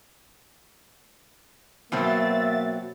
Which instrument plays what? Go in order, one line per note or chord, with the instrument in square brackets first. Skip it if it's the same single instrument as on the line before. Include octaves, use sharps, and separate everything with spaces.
[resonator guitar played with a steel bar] B2 F#3 C4 [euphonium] A#3 [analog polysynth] E5 A6